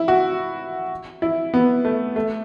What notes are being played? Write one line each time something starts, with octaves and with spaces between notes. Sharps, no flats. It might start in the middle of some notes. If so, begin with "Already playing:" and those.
Already playing: E4
F#4
E4
B3
A3
A3